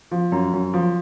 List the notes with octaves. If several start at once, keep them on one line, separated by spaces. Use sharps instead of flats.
F3
F#2
F#2
F3